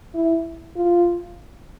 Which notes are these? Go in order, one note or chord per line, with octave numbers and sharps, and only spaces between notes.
E4
F4